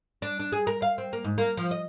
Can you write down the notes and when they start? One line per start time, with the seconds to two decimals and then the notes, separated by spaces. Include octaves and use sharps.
0.22 D4
0.40 D4
0.52 G#4
0.67 A#4
0.82 F5
0.98 C4
1.13 A#3
1.24 G#2
1.38 A#3
1.57 F3
1.71 D#5